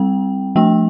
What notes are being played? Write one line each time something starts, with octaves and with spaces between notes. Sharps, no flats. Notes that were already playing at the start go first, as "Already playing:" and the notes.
Already playing: G3 C4 G5
F3 A3 D4 G5